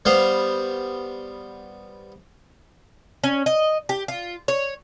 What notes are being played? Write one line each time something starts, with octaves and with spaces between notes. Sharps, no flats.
G3 B3 C5 F5
C#4
D#5
G4
F4
C#5